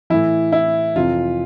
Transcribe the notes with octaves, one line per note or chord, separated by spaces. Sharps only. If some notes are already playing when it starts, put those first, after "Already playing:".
A2 E3 E4
E4
F2 C3 E3 F4